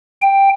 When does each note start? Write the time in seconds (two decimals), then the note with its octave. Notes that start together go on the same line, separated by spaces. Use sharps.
0.22 G5